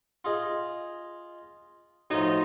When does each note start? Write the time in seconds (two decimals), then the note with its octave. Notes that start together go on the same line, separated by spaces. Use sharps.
0.25 F4 G#4 D#5
2.10 A2 F3 D#4 F#4 A#5 C6